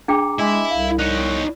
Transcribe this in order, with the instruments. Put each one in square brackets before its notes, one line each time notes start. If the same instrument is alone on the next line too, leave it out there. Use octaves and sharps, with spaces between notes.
[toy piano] D4 G#4 G5 [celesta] A#5 D6
[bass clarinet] G#3 [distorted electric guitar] E4 [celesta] D#5 G#5 D6
[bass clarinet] C2 [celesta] F5
[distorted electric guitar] D#4 C#5 [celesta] F#6